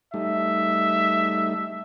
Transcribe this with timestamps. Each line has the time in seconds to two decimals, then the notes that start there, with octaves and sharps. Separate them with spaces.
0.14 G3 A3 D#4 E5